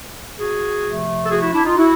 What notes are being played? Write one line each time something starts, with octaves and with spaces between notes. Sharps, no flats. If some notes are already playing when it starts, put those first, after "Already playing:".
F#4 G#4
C3 F3 A3
A4
F#4 G#4
E4 F#4
D4 E4
D#4 F4
E4 F#4